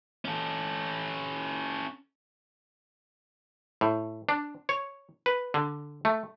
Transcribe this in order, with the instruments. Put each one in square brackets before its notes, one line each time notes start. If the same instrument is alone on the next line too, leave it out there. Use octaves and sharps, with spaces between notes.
[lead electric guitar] C#4 A4
[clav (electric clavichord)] A2
D4
C#5
B4
D3
A3